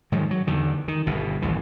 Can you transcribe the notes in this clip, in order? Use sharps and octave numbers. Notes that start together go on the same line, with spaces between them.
G#2 D#3 F3 F#3
F#3
E2 D3 D#3
D#3
G1 B2
A1 D#2 E3